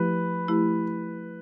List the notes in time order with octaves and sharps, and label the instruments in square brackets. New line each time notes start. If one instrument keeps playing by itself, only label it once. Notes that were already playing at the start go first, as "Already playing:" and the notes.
Already playing: [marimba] F3 A3 E4 G4 [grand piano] B4
[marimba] F3 A3 E4 G4